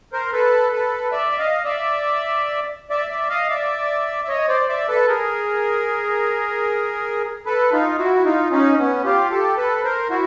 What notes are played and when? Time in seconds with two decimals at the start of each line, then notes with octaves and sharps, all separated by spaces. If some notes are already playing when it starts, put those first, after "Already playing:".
0.13 A#4 C5
0.33 A4 B4
0.72 A4 B4
1.12 D5 E5
1.32 E5
1.39 D#5 F5
1.65 D5 E5
2.90 D5 E5
3.10 D5 E5
3.30 D#5 F5
3.50 D5 E5
4.24 E5
4.28 C#5 D#5
4.49 C5 D5
4.68 D5 E5
4.88 A4 B4
5.08 G#4 A#4
7.46 A4 B4
7.73 D#4 F4
7.98 E4 F#4
8.16 E4
8.25 D#4 F4
8.51 C#4 D#4
8.78 B3 C#4
9.04 F4 G4
9.31 G4 A4
9.57 A4 B4
9.84 A#4 C5
10.10 E4 F#4